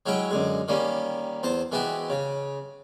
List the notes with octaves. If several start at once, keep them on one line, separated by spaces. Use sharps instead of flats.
F#3 G#3 C#4 E4 G5
F#2 D3 G#3
D#3 G3 A#3 C#4
E2 C5 A5
E3 G#3 B3 F#4 G4
C#3